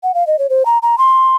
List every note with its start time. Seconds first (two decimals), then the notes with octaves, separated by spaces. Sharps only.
0.03 F#5
0.14 F5
0.27 D#5
0.39 C#5
0.50 C5
0.66 A#5
0.82 A#5
0.98 C6